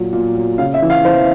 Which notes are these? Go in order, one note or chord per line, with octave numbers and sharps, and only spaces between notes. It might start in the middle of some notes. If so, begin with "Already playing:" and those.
Already playing: A#2 F#3
A#2
F#3
C#3 F5
E5
E3
F5
E3 C5